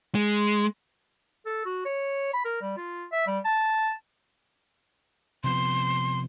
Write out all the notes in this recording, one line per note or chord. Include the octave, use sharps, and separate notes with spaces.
G#3
A4
F#4
C#5
B5
A#4
G3
F4
E5
G3
A5
C3 F3 B3 C6